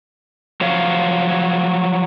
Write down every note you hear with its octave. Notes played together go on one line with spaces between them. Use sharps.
F3 F#3 C#5 F5